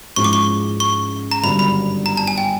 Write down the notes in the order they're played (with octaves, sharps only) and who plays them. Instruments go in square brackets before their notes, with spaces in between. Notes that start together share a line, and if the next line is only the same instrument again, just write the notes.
[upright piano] G#2 F3 G#3 C#4 E4 [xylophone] C#6
[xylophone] D6
C#6
C#6
A#5
[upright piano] G1 G2 D#3 F#3 [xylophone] B5
[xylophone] B5
A#5
A5
G#5
G5